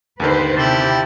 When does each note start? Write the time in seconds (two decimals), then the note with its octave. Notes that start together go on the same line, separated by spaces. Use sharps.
0.20 D#2 D3 D#3 B4 C5
0.57 C3 E4 G4 G5 A5